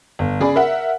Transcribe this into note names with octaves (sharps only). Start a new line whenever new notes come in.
G1
C#3 G#4 D5 B5
A#4 E5 F#5